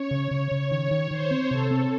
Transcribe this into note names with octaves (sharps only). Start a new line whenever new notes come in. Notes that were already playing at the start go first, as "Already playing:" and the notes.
Already playing: C#4 C#5
C#3
C#3
C#3
D#3 C#5
D#3
D#3 C5
C4
C3 A4
C4